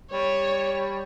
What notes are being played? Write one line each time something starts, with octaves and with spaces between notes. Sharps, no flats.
G3 C#5